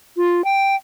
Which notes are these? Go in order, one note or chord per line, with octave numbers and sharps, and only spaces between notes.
F4
G5